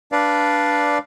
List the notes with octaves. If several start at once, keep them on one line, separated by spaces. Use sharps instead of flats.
D4 B4 D5 F5